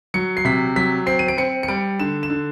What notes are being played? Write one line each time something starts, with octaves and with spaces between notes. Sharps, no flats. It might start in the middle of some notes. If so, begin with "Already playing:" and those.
F#3 C#7
C7
C3 B6
F#3 B6
C4 C7
D#7
D7
C4 C#7
C#7
G3 D7
D3 E7
E7
D3